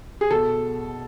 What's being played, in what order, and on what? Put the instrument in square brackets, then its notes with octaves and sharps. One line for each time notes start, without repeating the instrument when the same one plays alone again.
[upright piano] G#4
B2 A4